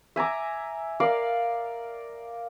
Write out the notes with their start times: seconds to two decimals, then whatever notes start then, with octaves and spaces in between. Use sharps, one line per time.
0.16 E5 G#5 A#5 D6
1.00 A#4 D5 F5 D6